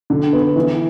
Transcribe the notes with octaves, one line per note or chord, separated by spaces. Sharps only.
D3
B3
E3